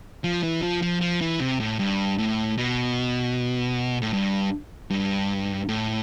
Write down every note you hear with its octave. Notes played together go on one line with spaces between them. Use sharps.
F3
E3
F3
F3
F3
E3
C3
A2
G2
A2
B2
A2
G2
G2
A2